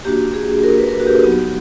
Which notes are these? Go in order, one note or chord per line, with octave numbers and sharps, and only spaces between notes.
A#3 D4 F#4 G4
G#4
A#3 D4 F#4 A#4
B4
A#4
B4
F#4
G4
F#3 B3 D#4 F#4